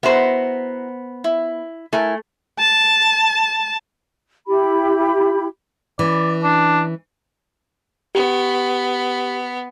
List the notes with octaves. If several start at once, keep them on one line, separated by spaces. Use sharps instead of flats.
B3 E4 F#4 C5 A#5
E4
A3 E4 A#4 G#5
A5
E4 G4 B5
E3 C#4 D5
D4
B3 G4